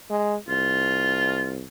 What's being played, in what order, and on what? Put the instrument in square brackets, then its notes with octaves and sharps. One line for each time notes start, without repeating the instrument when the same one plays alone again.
[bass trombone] G#3
[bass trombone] C2 [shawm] F4